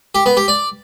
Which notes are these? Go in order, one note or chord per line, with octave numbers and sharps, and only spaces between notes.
G4
B3
G4
D5